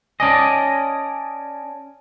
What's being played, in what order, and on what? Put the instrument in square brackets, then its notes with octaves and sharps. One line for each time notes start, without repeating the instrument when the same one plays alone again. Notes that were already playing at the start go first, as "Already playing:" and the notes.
[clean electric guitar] C#4 D5 D#5 [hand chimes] G#5 A5